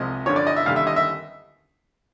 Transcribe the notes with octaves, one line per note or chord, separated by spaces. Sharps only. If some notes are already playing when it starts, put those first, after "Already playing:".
Already playing: C2 C3 F3 G#3 D#5
G2 D3 F3 C#5
D5
D#5
E5
D#2 D3 G3 F5
E5
D#5
E5